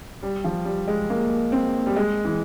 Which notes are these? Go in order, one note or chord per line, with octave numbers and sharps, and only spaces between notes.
G3
F3
G3
G#3
A#3
C4
G3
G#3
E3